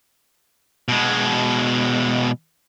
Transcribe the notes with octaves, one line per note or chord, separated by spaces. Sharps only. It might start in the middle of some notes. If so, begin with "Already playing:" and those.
B2 G#3